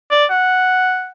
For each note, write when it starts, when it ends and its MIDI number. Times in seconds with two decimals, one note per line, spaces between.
0.11 0.25 74
0.30 1.10 78